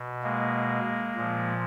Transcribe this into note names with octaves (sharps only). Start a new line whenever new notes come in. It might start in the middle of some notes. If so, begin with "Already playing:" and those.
Already playing: B2
G#3 A#3
A#2 F3